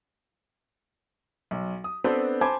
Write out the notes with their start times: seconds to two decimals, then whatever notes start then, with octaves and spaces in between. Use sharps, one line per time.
1.51 B1
1.84 D#6
2.04 B3 C4 D4 A4 B4 C5
2.41 C5 G#5 A5 B5 D6 G#6